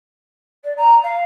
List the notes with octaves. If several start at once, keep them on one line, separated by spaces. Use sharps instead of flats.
D5
A#5
F5